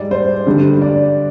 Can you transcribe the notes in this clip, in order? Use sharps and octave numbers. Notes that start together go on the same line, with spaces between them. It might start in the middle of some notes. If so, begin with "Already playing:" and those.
Already playing: G#2 G3 D5
C5
G2 D3 G3
D5